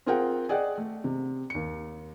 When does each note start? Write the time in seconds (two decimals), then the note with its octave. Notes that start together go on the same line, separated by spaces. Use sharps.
0.06 C4 F4 G#4 A#4 F#5 G5
0.49 G#4 D5 D#5 F#5 G5
0.78 A3
1.04 C3
1.50 D#2 C#7